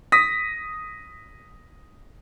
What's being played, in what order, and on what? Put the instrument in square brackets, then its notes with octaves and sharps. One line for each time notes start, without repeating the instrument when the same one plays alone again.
[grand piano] D#6 A#6 B6